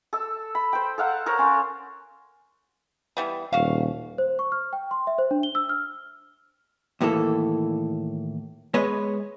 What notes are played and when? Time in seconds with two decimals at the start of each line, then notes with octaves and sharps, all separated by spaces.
0.13 A4 E6
0.55 B5
0.73 C5 G5
0.98 A4 F5 F#5 A#5
1.26 A4 A#4 C5 C#5
1.38 C#4 C6
3.17 E3 G3 B3
3.53 D#1 F#4 F5
4.18 C5
4.39 C#6
4.52 F6
4.73 G5
4.91 C6
5.07 E5
5.18 C5
5.31 D4
5.43 G7
5.55 E6
5.69 F6
7.01 D#2 A2 E3 A#3 A4
8.74 G#3 B3 B4 C#5 D#5